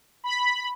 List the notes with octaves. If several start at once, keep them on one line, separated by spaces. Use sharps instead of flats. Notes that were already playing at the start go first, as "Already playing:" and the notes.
B5